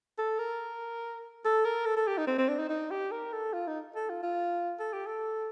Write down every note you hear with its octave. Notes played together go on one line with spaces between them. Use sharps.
A4
A#4
A4
A#4
A4
A4
G4
D#4
C4
C4
D4
D#4
D#4
G4
A#4
A4
F4
D#4
A4
F4
F4
A4
G4
A4